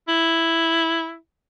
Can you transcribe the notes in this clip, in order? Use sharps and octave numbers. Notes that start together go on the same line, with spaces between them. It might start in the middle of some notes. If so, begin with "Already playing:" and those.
E4